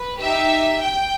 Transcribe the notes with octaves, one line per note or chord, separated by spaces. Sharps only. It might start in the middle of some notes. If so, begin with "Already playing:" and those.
Already playing: B4
D#4 G4 E5
G5